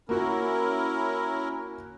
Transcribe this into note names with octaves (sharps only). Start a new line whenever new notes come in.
A#3 C#4 E4 F#4 A#4